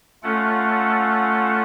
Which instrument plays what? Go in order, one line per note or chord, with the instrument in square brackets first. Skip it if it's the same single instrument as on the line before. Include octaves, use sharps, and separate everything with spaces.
[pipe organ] A3 C#4 F4 A4 F#5